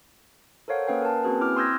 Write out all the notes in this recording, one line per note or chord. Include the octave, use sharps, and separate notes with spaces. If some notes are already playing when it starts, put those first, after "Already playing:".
A4 A#4 C5 C#5 F5 F#5
A#3 C#4 B4 F5 G5
A#4 A5
A#3 C4 C#4 F#4 G#4 B4
C4 E4 D6 F6
C6 D#6 E6 G6 G#6 A#6